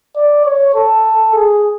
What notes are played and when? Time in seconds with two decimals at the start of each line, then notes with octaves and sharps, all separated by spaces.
0.16 D5
0.45 C#5
0.75 A4
1.35 G#4